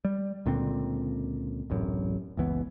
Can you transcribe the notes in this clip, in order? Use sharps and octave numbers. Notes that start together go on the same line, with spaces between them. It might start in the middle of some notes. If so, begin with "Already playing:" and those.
G3
C#2 A#2 D3 C4
D1 A1 F#2
F#1 C#2 E3 B3